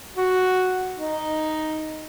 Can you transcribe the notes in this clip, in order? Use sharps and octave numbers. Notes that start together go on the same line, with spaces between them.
F#4
D#4